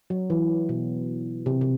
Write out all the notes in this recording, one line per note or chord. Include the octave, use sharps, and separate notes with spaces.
F#3
E3
B2
C3
C3